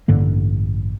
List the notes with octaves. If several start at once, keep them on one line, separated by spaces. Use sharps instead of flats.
A1 G2 D3 A#3